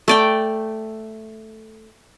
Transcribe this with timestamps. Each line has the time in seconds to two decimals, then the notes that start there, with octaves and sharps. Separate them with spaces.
0.08 A3 D5 G5